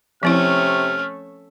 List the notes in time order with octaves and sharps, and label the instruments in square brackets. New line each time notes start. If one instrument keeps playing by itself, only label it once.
[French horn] C3 [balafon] F3 C4 E4 [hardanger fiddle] A3 C#4 [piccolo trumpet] F6